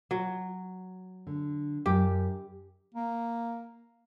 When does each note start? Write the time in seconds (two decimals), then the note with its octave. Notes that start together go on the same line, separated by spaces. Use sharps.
0.11 F#3
1.27 D3
1.86 F#2 G4
2.94 A#3